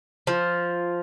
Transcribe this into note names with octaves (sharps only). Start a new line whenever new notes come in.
F3